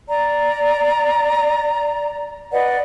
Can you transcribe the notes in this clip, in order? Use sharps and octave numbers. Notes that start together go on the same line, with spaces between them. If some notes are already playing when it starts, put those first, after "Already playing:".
D5 A#5
B4 D5 D#5 F#5